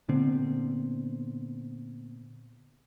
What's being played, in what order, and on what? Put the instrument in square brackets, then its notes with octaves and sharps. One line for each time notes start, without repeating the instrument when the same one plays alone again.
[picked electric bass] A#2 D3 B3 C4